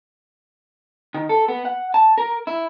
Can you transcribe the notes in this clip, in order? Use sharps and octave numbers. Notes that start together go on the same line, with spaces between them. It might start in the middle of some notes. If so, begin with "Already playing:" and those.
D#3
A4
B3
F#5
A5
A#4
E4